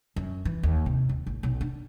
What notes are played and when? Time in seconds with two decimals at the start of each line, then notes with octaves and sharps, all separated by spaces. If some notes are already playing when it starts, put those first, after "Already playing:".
0.16 F#2
0.45 E3
0.63 D#2
0.86 C3
1.09 D#2
1.26 A1
1.43 B1
1.61 D4